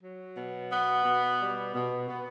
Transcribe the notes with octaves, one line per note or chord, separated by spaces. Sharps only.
F#3
B2
B3
B2
G3
B2
B3